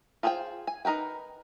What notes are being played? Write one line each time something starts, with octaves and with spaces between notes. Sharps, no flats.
F4 G#4 C5 E5 G5
G#5
D#4 A#4 B4 G5